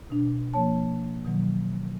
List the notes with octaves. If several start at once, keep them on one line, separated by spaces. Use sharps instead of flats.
B2 D4
F3 A#3 C#5 A5
B2 D#3 F#3